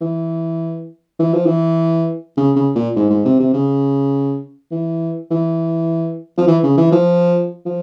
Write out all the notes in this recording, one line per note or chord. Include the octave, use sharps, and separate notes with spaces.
E3
E3
F3
E3
C#3
C#3
A#2
G#2
G#2
C3
C3
C#3
E3
E3
F3
E3
C#3
E3
F3
F3